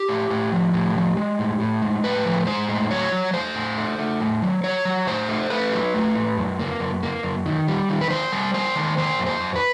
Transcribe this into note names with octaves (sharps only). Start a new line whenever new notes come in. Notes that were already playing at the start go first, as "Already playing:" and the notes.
Already playing: G4
A2
A2
F3
A2
F3
G#3
A2
A2
G#3
A2 B4
F3
G#3 C5
A2
F#3 C#5
F#3
A3 C5
A2
A3
A3
A2
F#3
F#3 C#5
F#3
A2 C5
A3
A3 B4
F#3
A3
A2
F#2
A#3
F#2
A#3
F#2
D#3
G3
D#3
B4
A#3 C5
G3
A#3 C5
D#3
A#3 C5
F#2
C5
F#2
B4